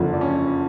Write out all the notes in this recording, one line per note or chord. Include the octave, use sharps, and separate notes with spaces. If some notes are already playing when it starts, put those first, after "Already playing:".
Already playing: F#1 F2 D3 F3
D5
C#4 C#5